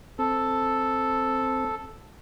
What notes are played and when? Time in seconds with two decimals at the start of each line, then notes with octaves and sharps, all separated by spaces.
0.19 C4 A4